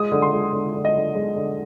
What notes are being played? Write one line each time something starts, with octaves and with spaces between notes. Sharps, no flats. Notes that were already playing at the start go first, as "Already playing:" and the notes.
Already playing: G#3 D#6
D3
C6
G#3
D3
D3
D#5
D3
G#3
D3